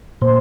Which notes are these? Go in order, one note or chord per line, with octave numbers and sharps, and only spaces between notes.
A#2 C5